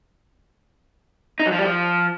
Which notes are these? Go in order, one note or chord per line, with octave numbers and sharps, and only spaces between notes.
D#4
F#3
F3
G3
F3